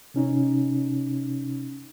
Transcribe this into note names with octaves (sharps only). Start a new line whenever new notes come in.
C3 C#4 D#4